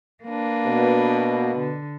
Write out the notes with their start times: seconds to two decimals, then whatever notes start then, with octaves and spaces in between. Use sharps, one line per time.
0.25 A#3 D4 B4
0.66 B2
1.60 D3